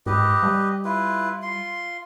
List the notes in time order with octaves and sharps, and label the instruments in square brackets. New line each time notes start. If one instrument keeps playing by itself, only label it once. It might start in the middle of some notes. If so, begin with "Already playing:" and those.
[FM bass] G#2 [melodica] G4 B4 D#5
[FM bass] G3
[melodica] E4 F4 B4
F4 C6